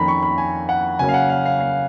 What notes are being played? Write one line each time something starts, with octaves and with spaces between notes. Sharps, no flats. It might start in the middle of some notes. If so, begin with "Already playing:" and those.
Already playing: F2 D#3 A#3 C#4 A#5 B5
C#6
B5
G#5
F#5
C#3 F#3 A#3 C#4 G#5
F5
F#5
F5
F5
F5